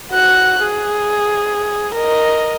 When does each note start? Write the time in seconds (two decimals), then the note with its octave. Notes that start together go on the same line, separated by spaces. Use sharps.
0.11 F#4 F#6
0.63 G#4
1.95 A#4 D#5